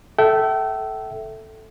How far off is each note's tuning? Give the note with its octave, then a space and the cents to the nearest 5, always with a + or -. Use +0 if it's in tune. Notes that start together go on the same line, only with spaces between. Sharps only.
A4 -5 E5 +0 G5 -35